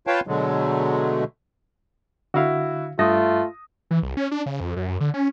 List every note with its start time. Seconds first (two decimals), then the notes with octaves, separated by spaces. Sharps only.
0.07 F4 B4 C#5 F5 G5 A5
0.27 B2 D3 F#3 G#3 A3
2.34 D3 E4 F#4 F5
2.99 G2 A3 F4 D#6 A#6
3.91 E3
4.03 C2
4.17 C#4
4.31 D4
4.46 C#3
4.60 F2
4.76 F#2
4.88 F#2
5.00 D3
5.14 C#4